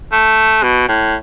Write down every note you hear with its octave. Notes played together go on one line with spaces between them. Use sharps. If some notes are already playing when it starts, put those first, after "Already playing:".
A3
B2
A2